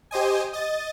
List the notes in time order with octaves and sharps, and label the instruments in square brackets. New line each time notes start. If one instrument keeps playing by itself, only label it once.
[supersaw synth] G4 C5 D#5 G#5
D#5 A6